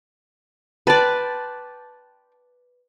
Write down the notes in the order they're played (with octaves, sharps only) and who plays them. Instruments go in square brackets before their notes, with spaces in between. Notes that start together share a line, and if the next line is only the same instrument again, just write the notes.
[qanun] B4 D5 [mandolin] G5 A5 C6